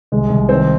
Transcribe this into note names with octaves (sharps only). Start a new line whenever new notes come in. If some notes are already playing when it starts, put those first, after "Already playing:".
C2 G#3
C2
D#3 C4